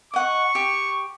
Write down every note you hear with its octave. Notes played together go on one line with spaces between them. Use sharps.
D#5 F#5 C#6
G4